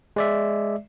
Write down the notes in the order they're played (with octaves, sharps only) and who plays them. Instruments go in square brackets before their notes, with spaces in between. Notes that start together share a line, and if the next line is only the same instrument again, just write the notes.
[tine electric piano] G#3 D5 E5